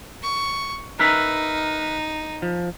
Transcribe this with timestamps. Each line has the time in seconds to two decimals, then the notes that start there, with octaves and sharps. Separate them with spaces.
0.23 C#6
0.99 D#4 A#4 B4 E5
2.42 F3